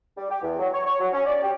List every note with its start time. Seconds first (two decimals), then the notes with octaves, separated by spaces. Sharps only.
0.17 G3
0.31 G4
0.42 E2
0.59 F#3
0.73 C#5
0.86 C#5
1.00 F#3
1.13 C#4
1.26 D5
1.43 G4